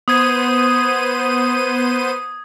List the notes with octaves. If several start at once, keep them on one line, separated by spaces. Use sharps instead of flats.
B3 C5 D#6 G#6 D#7